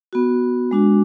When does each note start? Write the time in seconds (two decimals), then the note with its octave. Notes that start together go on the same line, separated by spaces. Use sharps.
0.13 B3 F#4
0.71 G#3 D4 F#4